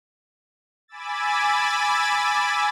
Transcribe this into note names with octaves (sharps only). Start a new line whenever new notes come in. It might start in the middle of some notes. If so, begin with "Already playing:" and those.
G#5 B5 D6 E6 A6